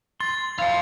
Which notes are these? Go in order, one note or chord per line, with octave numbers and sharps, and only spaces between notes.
C6 A6
E4 C5 F5 G5